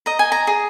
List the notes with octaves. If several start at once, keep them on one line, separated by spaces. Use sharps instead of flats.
D#5 A#5
G#5
A#5
G#4